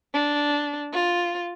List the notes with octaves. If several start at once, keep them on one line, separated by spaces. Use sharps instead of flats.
D4
F4